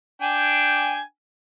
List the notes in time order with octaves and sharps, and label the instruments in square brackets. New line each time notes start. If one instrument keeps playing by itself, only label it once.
[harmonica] D4 G5 G#5